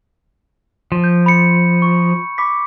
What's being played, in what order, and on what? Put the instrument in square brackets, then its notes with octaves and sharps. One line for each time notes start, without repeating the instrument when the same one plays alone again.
[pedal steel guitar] F3
[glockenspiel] G6
B5 C#7
C#6
B5 D6 B6